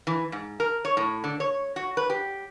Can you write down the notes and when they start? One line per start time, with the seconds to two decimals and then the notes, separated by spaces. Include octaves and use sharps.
0.07 E3
0.32 G#2
0.60 A#4
0.85 C#5
0.97 A2
1.24 D3
1.40 C#5
1.76 F#4
1.97 B4
2.10 G4